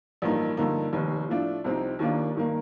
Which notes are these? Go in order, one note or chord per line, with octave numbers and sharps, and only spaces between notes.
A1 G2 F3 A#3 D#4
G2 D3 F3 A#3 D#4
F1 D#2 D#3
A2 F3 A3 D4 F4
C2 C3 F3 C4 D#4
D#2 D#3 A#3 D4 F4
G2 D#3 A#3